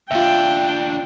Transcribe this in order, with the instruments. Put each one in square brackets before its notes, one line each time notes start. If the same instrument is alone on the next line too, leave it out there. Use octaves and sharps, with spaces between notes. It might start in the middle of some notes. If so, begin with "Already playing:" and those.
[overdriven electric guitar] D#2 D4 [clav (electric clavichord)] F4 E5 [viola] G5